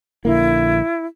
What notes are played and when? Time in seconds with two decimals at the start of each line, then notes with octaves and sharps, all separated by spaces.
0.25 A#1 D3 A#3 E4